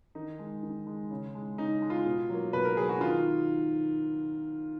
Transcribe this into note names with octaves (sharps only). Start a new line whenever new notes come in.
D#3 D#4
G#3
D#3
G#3
C#3
G#3
C#3 D#4
G#3
F4
B2
F#3 A#3
B2 B4
A#4
F#3 A#3 G#4
F#4
D#3 F4